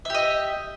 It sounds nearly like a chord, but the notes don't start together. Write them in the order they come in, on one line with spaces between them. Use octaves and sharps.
E5 G4 D#5